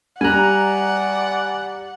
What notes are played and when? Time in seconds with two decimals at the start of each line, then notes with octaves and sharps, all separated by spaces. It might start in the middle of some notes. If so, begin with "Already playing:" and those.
0.21 G3 D5 F#5 G#5 A#5 F#6